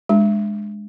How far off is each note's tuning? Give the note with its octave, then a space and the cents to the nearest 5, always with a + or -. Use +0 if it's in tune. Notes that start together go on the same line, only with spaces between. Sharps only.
G#3 +0 D4 +10